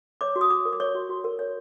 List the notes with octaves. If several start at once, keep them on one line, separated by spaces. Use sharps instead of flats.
C#5 D6
F#4
D#6
F#4 D6
A#4
D6
C#5 C#6
F#4
F#4
A#4
C#5